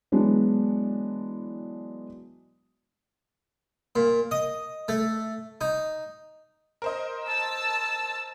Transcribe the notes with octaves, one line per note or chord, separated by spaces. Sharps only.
E3 F#3 G#3 B3 D4
A#2
D#5
A3
D#4
A#4 C5 D#5
A5 E6